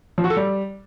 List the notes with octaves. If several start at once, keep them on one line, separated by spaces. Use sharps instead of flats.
F3
F#4
A4
G3